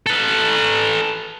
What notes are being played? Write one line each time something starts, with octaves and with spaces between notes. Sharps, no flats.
A4 B4